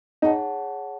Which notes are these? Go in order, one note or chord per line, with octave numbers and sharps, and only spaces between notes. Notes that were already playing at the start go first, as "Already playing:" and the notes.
D#4 G#4 C#5 F#5 A5